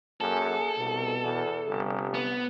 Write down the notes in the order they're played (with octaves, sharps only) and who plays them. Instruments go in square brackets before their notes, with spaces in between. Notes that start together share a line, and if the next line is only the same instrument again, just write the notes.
[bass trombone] F#2 [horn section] A#3 G#4 [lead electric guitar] A4
[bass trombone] C2 [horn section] B2
[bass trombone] E2
[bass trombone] G1 [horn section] C3 G3
[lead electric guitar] B3